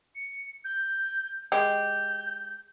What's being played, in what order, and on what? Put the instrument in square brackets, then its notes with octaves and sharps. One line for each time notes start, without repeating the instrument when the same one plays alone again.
[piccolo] C#7
G6
[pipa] G#3 G4 [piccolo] G6